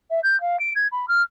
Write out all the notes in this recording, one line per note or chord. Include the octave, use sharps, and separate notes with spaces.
E5
G6
F5
D7
G#6
B5
F6